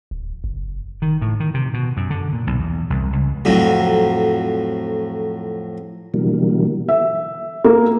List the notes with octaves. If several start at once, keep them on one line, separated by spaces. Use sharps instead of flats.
D1
F#1
D#3
A2
D#3
C3
B2
F#2
D3
A#2
B1
E2
C2
C#2
F2 A2 F#3
B2 D3 E3 F#3 G3 A#3
E5
A#3